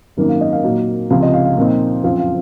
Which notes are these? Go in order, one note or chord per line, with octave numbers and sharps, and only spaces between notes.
G#1 F#2 D#3 A#3 A#4
F5
D#5
F5
A#2 F#3 A#3 D#4
C#2 C3 F3 C4 F5
D#5
F5
F5
A#2 F3 C4 D#4
F#1 F2 C#3 F3 C4 F5
F5